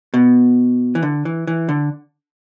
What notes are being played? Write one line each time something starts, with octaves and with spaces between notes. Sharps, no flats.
B2
E3
D3
E3
E3
D3